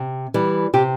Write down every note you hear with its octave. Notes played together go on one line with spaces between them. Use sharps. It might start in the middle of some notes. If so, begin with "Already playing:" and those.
Already playing: C3
E3 G3
C3 G4